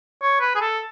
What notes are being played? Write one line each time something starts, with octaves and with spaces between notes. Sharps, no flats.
C#5
B4
G#4
A4